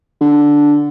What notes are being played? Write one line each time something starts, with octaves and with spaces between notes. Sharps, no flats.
D3